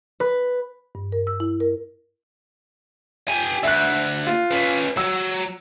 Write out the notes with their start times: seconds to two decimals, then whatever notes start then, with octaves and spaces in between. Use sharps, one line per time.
0.20 B4
0.95 G2
1.12 A#4
1.27 E6
1.40 E4
1.60 A#4
3.28 G4 G#5
3.63 D2 E5 F#6
4.27 F4
4.51 C#4 B4
4.97 F#3 E6